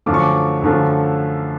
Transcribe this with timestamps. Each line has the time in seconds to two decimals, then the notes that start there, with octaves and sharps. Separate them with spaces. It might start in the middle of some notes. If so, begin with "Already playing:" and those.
0.06 F#2 D3 F3 A3 D6
0.14 C#6
0.23 D6
0.62 F#2 D3 F3 A3